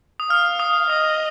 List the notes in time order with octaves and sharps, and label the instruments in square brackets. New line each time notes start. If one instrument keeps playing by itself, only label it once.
[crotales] D#6
[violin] F5 [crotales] F6
[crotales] D#6
[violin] D#5 [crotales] D#6